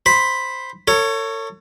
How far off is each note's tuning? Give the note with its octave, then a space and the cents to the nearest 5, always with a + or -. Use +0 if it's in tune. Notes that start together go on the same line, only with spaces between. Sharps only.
C5 +0 B5 +0
A4 +40 C#5 +0